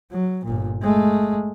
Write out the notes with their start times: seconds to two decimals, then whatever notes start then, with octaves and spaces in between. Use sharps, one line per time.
0.11 F#3
0.45 G1 A#2
0.81 G#3 A3